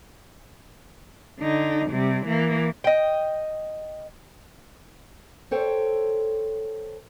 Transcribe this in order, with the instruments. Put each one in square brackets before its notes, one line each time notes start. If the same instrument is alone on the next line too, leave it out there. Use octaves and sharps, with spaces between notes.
[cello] D3 D#4
C3 G3
E3 A#3
[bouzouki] D#5 G5
[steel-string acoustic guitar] A4 C5 C#5 G5